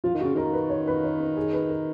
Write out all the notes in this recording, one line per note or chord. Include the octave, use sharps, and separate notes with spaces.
F3 F4
D#3
C#3 F#4
D#3 A#4
B4
C#5
B4
C#5
B4
G#4
B4
A#4